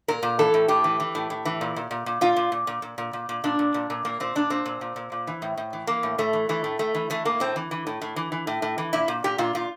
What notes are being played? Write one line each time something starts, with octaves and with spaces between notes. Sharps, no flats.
A#2 A#4
A#2
E3 A4
A2
A2 G4
E3
E3
A2
A2
E3
A#2
A#2
A#2
A#2
A#2 F4
A#2
A#2
A#2
A#2
A#2
A#2
A#2
A#2 D4
A#2
A#2
A#2
A#2 A#3
A#2 C4
A#2 D4
A#2 C4
A#2
A#2
A#2
A#2
E3
A2
A2
E3
E3 A#3
A2
A2 A3
E3
E3 A3
A2
A2 A3
E3
E3 A3
A2 A#3
A2 C4
E3
E3
A2
A2
E3
E3
A2
A2
E3
A#2 E4
A#2
A#2 G4
A#2 F4
A#2 F4